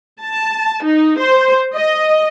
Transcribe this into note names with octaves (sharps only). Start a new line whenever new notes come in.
A5
D#4
C5
D#5